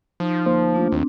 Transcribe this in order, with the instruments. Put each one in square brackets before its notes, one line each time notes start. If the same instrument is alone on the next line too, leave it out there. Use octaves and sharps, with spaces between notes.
[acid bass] F3 [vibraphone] D#4
[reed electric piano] D2 A#3 C5
[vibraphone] A3 D4 F4
[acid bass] D#2 [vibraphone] C4 D4